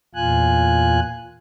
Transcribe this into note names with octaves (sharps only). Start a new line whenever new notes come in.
E2 A#2 F4 G#5 F#6